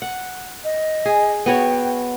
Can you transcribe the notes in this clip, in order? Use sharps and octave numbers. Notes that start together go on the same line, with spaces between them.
F#5
D#5
G#4
B3 F#4 C#5 G5